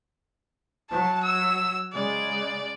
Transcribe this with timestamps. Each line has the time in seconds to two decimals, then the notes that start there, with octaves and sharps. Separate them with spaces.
0.91 F#3 A5
1.23 E6
1.93 C#3 G#3 D5